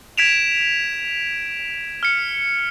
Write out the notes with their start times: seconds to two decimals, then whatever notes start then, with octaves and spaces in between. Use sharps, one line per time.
0.18 G#6 B6 D7 E7 F7
2.03 F6 C#7